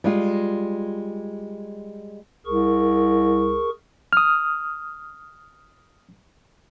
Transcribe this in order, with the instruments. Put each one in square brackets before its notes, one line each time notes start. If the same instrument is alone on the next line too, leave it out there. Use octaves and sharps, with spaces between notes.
[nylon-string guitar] G3 G#3 F4
[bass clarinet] C2 [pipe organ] G#4 A#4 C#6
[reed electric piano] D#6 F6